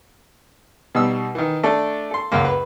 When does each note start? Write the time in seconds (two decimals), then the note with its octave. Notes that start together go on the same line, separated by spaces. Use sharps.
0.95 B2 G3 D#4 D#6 E6
1.35 D#3 E3
1.63 A3 D4 A4
2.11 A4 C6
2.32 C#2 F#2 A#3
2.45 B4